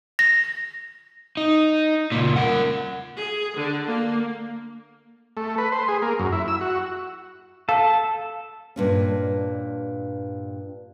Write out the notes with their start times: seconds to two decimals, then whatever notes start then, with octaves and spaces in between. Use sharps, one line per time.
0.19 A#6
1.37 D#4
2.12 C#2 A#2
2.36 A#4 F#5
3.17 G#4
3.57 D3
3.89 A#3
5.37 A3
5.58 B4
5.72 C5
5.88 G#4
6.02 A#3
6.19 F#2
6.32 E4
6.48 E6
6.61 F#4
7.69 A4 F5 A5
8.76 G2 A#2 C#4